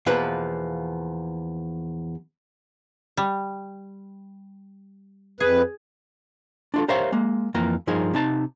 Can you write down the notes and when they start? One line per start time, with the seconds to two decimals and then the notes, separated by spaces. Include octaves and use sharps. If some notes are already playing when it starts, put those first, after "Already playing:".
0.06 E2 B2 F3 A#3 B4
3.17 G3
5.40 F2 G#4 B4
6.74 D4 F4 A4
6.88 G4 A#4 C5 C#5 E5 F5
7.12 G#3 A#3
7.54 F2 E3 A#3 A#5
7.87 G2 F3 D#4 G#4 A#4
8.13 C3 D#4 A5 A#5